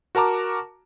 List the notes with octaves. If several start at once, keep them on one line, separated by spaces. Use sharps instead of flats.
F#4 A#4 A5 A#5 D6